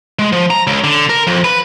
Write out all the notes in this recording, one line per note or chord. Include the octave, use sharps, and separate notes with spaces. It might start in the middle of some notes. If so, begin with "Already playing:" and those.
G#3
F3
A#5
C#2
D3
A#4
F2
B4